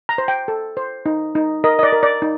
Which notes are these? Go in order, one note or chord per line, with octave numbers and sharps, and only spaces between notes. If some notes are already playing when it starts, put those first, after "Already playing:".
A#5
C5
G5
A4
C5
D#4
D#4
A#4 D#5
D#5
D5
A#4
D5
D#4